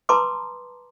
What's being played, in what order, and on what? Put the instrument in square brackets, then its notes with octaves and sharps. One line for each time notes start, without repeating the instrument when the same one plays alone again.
[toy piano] B4 A5 A#5 C6 D6 D#6